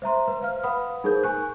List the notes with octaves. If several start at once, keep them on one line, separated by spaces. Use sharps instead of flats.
C5 E5 A#5 C6
B4
C5 F5 F6
B4 F5 F#5 B5 D#6
D#4 G#4 A#4 C5 G6
G#5 C#6 F#6